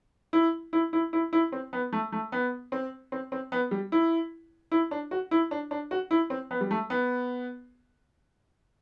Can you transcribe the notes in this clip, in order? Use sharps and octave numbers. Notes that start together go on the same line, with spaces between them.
E4
E4
E4
E4
E4
C4
B3
A3
A3
B3
C4
C4
C4
B3
G3
E4
E4
D4
F#4
E4
D4
D4
F#4
E4
C4
B3
G3
A3
B3